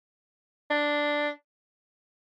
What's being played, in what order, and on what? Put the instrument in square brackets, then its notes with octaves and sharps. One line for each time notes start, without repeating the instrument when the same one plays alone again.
[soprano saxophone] D4